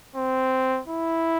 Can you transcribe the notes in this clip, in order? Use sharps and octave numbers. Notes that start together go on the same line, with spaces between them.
C4
E4